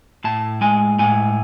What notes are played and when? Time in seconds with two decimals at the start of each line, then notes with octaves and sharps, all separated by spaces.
0.24 A2 A5
0.61 G#3 G#5
0.99 A2 G#5